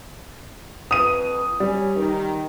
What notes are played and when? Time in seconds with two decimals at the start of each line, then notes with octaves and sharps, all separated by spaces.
0.91 F2 B4 D#6 D#7
1.60 G3 C#4
1.96 D#3